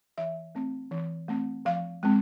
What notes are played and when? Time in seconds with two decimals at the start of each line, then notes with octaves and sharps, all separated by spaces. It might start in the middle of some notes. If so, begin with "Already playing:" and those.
0.18 E3 E5
0.55 A3 C4
0.91 E3
1.28 A3 C4
1.65 F3 F5
2.03 G#3 C4